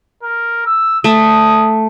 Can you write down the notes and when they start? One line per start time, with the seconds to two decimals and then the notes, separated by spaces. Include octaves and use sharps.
0.23 A#4
0.66 E6
1.04 A3 D#6